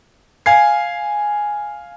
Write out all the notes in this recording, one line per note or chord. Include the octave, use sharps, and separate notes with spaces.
F5 G#5 G#6 C7